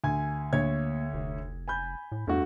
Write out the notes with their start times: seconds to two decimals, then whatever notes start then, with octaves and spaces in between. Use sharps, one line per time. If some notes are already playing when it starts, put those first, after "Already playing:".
0.04 D2 G#5 G#6
0.53 D2 A#3 C#5 G#6
1.14 F1
1.68 G#5 B5 G6
2.12 A2
2.27 E2 G2 A3 F#4